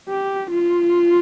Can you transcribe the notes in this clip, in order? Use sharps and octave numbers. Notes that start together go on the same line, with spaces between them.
G4
F4